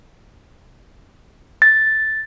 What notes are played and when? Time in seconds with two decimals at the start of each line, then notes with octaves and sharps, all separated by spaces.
1.62 A6